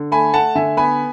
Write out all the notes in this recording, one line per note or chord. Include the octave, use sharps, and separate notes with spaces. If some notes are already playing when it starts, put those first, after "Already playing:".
Already playing: D3
A3 G#5 B5
A3 F#5 A5
D3 E5 G#5
B3 G#5 B5